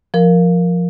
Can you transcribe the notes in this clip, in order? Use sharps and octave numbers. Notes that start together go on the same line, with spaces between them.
F3 A#4